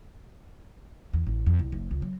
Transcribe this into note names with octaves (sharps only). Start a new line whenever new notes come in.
E2
A1
F2
C2
F#1
C#2
F#3